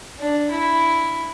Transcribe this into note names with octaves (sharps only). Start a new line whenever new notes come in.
D4
E4